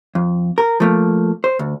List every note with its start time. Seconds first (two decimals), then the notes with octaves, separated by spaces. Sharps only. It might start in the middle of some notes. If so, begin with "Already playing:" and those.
0.15 F2
0.58 A#4
0.80 F3 A3 A#3
1.44 C5
1.59 D2